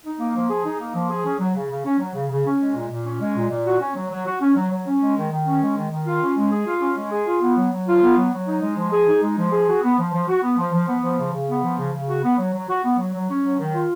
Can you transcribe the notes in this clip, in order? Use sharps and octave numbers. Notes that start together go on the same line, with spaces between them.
D#4
A#3
F3
G#4
D#4
A#3
F3
G#4
C#4
F#3
C#3
C#3
C#4
F#3
C#3
C#3
C#4
G#3
A#2
A#2
C#4
G#3
A#2
A#2
F#4
C#4
F#3
F#3
F#4
C#4
F#3
F#3
C#4
G#3
D#3
D#3
C#4
G#3
D#3
D#3
F4
C#4
G#3
G#4
F4
C#4
G#3
G#4
F4
B3
F#3
F#3
F4
B3
F#3
F#3
D#4
G#3
F3
G#4
D#4
G#3
F3
G#4
F#4
B3
F3
F3
F#4
B3
F3
F3
B3
F3
C#3
C#3
B3
F3
C#3
C#3
F#4
B3
F#3
F#3
F#4
B3
F#3
F#3
C#4
F#3
D#3
F4